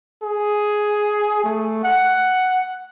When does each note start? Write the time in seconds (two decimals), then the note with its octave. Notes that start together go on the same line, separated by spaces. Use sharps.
0.23 G#4
1.44 A3
1.84 F#5